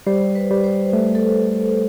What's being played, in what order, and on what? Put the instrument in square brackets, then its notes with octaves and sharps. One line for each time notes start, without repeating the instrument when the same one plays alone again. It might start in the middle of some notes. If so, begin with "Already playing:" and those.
[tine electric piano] G3 [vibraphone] C5
[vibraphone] B4
[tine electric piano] G3
[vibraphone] C5
[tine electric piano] A3
[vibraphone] A4